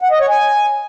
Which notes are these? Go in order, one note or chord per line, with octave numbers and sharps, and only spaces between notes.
F#5
D#5
C#5
G#5